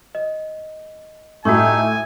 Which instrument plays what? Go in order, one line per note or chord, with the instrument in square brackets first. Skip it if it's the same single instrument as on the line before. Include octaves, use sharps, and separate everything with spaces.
[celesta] D#5
[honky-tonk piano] A2 [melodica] D#4 G4 A4 [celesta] F#4 C#6 [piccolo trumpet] G#5